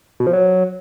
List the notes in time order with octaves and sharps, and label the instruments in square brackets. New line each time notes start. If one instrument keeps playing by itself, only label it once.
[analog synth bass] B2
F3
F#3